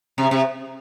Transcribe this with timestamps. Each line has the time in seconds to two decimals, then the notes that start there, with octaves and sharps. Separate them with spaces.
0.18 C3
0.31 C3